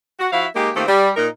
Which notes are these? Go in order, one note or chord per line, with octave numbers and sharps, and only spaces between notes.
F#4
F3 E4 F#4 E5 F5
G#3 A#3 D#4 G4
D#3 A3 A#3 C4 F4 G4
G3
A#2 D#4 A#4